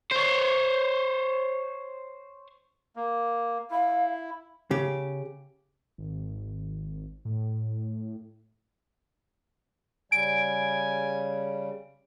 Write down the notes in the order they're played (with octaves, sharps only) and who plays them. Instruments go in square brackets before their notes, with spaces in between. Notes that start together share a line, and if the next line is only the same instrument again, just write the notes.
[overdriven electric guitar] C5 C#5
[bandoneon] A#3
[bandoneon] E4 [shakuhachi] F5
[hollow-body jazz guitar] C#3 [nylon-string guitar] G4
[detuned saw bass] G#1
A2
[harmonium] C#3 G3 [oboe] G#5 [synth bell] D7